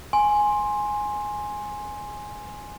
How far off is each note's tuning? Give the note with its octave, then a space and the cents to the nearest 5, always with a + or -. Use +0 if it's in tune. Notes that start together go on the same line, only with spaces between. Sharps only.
G#5 +0 C6 +15